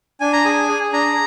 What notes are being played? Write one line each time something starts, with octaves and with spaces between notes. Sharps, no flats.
D4 G#5
A#5
G#4 G#5
G#4
D4 A#5